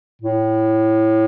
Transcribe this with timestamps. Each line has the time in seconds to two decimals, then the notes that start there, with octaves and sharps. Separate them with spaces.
0.21 A2